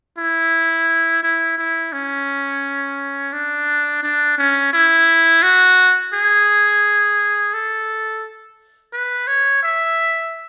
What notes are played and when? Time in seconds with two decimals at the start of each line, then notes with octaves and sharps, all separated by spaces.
0.18 E4
1.23 E4
1.58 E4
1.93 C#4
3.33 D4
4.03 D4
4.38 C#4
4.73 E4
5.43 F#4
6.14 G#4
7.54 A4
8.93 B4
9.28 C#5
9.63 E5